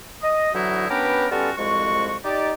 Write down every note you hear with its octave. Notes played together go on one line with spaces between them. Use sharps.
D#5
D3 E3 F#3 D#4 E4 F#4
B3 C#4 D4 G4 A#4 B4
G3 B3 C#4 F4 F#4 A4
C2 F2 G#3 F#4 C#6
D#4 G4 D5